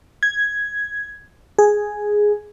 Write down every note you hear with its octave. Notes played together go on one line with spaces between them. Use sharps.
G#6
G#4